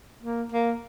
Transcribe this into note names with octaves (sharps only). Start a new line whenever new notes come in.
A#3
A#3